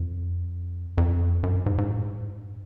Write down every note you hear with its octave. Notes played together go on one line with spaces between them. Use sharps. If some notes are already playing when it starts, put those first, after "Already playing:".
Already playing: F2
F2
F#2
G#2
G#2
A2
G#2
G2